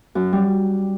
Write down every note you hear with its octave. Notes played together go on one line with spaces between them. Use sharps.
F#2
G3